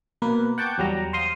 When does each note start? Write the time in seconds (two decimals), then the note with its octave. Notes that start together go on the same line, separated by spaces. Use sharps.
0.22 B2 A#3 B4
0.58 F#5 G5 A5 C#6 D6 G6
0.78 E2 F#3 G3 A#5
1.13 C5 F5 C6 D#6